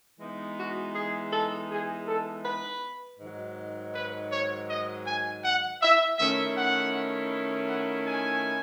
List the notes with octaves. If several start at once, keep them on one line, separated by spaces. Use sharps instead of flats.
E3 G#3 B3 D#4
F#4
G#4
A4
G#4
A4
B4
G#2 D#3 F#3
B4
C#5
D#5
G#5
F#5
E5
D#3 A3 C#4 E4 E5
F#5
F#5
G#5